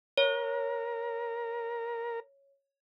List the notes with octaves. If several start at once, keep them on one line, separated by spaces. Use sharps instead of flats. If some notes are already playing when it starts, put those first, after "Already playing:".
A#4 C#5